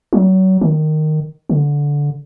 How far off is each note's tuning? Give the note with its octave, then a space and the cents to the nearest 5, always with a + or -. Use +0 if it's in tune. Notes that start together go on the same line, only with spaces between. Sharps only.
F#3 +30
D#3 -10
D3 -15